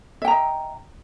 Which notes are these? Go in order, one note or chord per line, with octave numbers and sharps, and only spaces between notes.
D#5 E5 G5 A#5